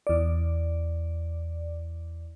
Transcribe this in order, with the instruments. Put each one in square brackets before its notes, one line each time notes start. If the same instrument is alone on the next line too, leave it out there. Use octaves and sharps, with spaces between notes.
[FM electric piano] E2 D5